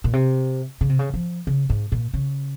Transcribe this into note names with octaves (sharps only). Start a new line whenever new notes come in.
A#2
C3
C#3
C3
C#3
F3
C#3
G#2
A#2
C#3